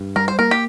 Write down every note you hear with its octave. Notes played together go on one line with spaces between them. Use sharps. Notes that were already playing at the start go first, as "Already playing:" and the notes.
Already playing: G2
G3 A#4
C5
A#3 A#4
G4